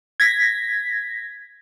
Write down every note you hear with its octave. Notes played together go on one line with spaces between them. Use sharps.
G#6 A#6 B6